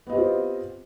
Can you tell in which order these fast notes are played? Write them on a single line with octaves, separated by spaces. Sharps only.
B3 D#5 G4 C4 F4